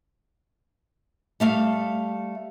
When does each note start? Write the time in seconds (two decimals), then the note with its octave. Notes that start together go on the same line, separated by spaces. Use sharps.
1.40 G3 A3 F5